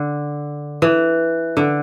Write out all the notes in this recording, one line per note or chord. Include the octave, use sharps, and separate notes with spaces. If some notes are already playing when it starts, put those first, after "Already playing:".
Already playing: D3
E3
D3